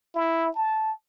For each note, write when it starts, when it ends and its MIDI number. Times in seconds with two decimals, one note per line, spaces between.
0.15 0.50 64
0.56 0.92 81